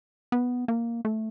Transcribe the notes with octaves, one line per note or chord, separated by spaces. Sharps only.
B3
A#3
A3